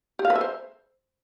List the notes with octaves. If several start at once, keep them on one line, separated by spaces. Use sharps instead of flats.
G4
F5
B4
E5
C5